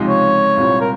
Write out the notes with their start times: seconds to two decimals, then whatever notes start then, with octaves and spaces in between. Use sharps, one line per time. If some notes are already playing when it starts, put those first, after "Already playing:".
Already playing: C#2 C3 F3 G#3 D#4
0.09 C#5
0.57 C2 A#2 G3 C4
0.81 A#4